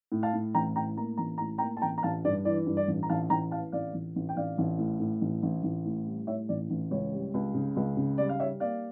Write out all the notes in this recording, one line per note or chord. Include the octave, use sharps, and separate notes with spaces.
A2
F5 A5
A2
A1 G5 A#5
A2 G5 A#5
A#3 A#5
A1 A#5
A2 A#5
A#3 G5 A#5
A5
A1 G5 A#5
A#5
A1 F5 A5
G2 D5
E3 D5
G2
D5
A1
A#5
A1 F5 A5
A1 G5 A#5
E3 F5 A5
A1 D5 F5
A1
A1
G5
A1 D5 F5
A1
A2
A2
A1
A1
A1
A2
G3
A2 C#5 E5
A1 D5
A1
C#2 C#5
G3
C#2
C#3
C#2
C#3
G3 D5
F5
G3 C#5 E5
A#3 D5 F5